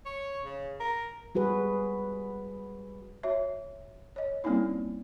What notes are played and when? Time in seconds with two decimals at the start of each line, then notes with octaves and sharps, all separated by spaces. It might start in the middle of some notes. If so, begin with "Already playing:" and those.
0.06 C#5
0.45 C#3
0.80 A#4
1.35 G3 F#4 G#4 B4
3.23 F#4 C#5 E5
4.16 C#5 D#5
4.44 G3 A#3 C4 C#4 D#4 E4